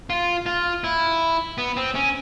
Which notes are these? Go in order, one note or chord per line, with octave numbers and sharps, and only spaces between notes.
F4
F4
E4
B3
C4
C#4